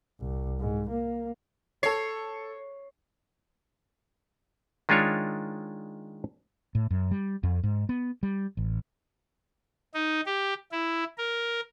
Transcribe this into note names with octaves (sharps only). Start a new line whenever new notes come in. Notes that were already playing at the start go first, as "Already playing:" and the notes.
C2
G#2
A#3
A4 C#5 C7
D#3 G#3 D4 F4 C#5
A2
F#2
G3
F2
G#2
B3
G3
A1
D#4
G4
E4
A#4